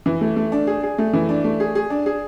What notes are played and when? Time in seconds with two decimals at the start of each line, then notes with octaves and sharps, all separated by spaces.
0.06 E3
0.21 A3
0.36 A3
0.52 D4
0.67 G#4
0.83 G#4
0.98 A3
1.13 E3
1.29 D4
1.44 A3
1.60 G#4
1.75 G#4
1.90 D4
2.06 G#4